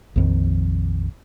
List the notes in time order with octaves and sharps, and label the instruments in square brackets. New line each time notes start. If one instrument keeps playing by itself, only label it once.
[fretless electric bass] A#1 F2 D#3